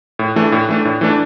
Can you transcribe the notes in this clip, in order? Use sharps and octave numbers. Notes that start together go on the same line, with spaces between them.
A2
E3 A3 D4
A2
E3 A3 D4
A2
E3 A3 D4